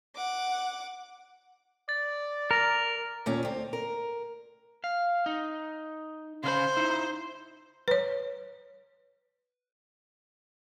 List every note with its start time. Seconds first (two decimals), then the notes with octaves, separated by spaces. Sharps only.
0.16 F#5 D6
1.89 D5 A6
2.51 A#4 A#5 A#6 F7
3.26 D#2 A#2 C#4
3.43 D2 C4
3.73 A#4
4.84 F5
5.26 D#4
6.44 C#3 C5 F5 B5
6.77 D#4 E4
7.88 B4 C#5